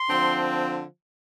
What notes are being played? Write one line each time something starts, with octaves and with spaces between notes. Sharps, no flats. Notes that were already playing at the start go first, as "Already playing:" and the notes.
Already playing: C6
D3 F3 C4